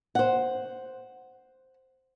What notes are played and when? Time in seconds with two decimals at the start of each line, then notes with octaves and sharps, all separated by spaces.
0.15 C5 F#5